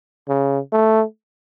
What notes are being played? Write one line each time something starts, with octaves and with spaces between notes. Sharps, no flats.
C#3
A3